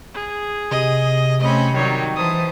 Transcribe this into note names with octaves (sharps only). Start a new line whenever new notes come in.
G#4
C3 D#5
A3 C4 C#4 D#5 B5
D#3 F#3 G3 D#4 C#5
E3 C5 A5 D#6